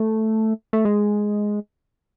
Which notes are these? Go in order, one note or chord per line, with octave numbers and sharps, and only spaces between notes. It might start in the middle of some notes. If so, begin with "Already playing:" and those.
Already playing: A3
A3
G#3